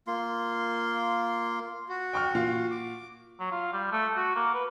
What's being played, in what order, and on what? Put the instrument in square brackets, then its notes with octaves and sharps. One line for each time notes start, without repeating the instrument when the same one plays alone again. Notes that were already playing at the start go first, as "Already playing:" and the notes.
[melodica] A#3 F4 C6
[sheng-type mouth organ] F#4
[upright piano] G5 C#6 F6
A#2 F4
[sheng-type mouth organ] D6
[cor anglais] F#3
F4
G3
A3
F#4
A#3
B4